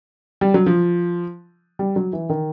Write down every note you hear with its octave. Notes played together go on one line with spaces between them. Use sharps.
G3
F#3
F3
G3
F#3
E3
D#3